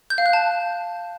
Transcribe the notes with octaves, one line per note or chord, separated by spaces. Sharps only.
G6
F5
F#6
A5